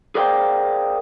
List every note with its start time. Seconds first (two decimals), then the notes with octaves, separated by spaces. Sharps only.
0.15 G#4 A#4 C5 D5 F5 G5